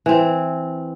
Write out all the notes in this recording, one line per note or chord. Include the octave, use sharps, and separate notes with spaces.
E3 C4